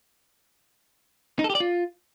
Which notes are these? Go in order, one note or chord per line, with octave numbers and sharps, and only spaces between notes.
D#4
A4
G4
D5
F4